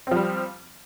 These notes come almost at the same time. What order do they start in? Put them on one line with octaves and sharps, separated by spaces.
C4 F3 G3